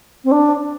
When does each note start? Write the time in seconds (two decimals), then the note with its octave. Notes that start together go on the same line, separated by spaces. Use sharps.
0.24 C4
0.31 D4